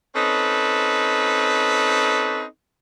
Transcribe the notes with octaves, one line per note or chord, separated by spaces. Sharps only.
C4 C#4 D#4 A4 B4